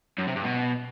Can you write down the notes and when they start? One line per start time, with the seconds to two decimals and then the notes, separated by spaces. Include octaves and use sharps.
0.19 F#2
0.27 C3
0.36 G2
0.45 B2